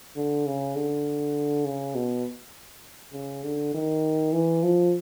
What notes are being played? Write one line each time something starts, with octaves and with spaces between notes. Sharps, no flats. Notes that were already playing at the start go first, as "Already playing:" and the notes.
D3
C#3
D3
C#3
B2
C#3
D3
D#3
E3
F3